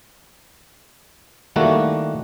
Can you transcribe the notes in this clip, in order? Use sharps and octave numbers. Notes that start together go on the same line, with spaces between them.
D#3 G3 A3 A#3 E4 F#4